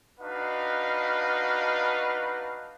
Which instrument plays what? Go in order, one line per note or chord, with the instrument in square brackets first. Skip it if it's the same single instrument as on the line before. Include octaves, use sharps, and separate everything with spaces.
[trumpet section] D4 D#4 F#4 B4 D#5 F5